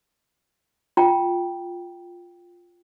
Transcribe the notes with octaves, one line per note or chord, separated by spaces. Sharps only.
F4 G5 A#5